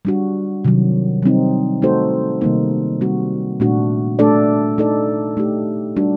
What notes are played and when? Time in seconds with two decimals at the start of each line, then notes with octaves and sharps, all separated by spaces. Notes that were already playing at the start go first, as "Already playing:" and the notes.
0.05 G3 D4 F#4
0.65 C3 D#3 F#3
1.23 G3 C4 D#4
1.82 A3 D#4 F#4 A4 C5
2.41 C3 D#3 G3 A#3 D#4
3.01 G3 C4 F#4
3.60 A#2 A3 D4 F#4
4.19 A3 D4 A4 D5
4.78 A3 D#4 A4 D5
5.37 A3 D#4 G4
5.96 G3 D4 F#4